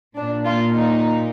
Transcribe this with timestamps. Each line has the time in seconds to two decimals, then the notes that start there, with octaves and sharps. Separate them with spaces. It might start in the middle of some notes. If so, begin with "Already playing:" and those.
0.15 A#2 D4
0.45 F4
0.74 D#4